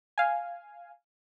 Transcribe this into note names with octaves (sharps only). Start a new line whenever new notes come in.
F5 G#5